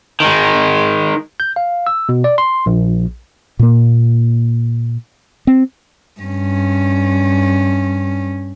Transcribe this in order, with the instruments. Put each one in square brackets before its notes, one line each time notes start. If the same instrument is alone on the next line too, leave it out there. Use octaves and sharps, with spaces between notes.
[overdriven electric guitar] D#3 G#3
[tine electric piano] G6
F5
E6
B2
D5
C6
A#1
[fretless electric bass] A#2 A#3
C4
[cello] G2 C#4